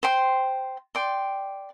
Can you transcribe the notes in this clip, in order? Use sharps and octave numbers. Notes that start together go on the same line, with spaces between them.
C5 G5 C6
D5 G5 C6